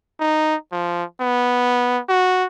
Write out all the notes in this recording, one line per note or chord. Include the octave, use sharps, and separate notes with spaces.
D#4
F3
B3
F#4